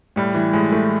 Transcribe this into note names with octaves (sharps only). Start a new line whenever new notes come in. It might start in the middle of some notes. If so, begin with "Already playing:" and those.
A2 G3
E3
A2 G#3
E3 A3